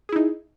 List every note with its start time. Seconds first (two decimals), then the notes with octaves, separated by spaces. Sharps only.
0.09 G#4
0.12 E4
0.16 D#4